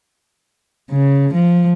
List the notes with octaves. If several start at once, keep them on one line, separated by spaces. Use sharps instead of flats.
C#3
F3